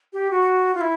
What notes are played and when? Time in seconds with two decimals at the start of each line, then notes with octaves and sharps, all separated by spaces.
0.13 G4
0.31 F#4
0.75 F4
0.81 E4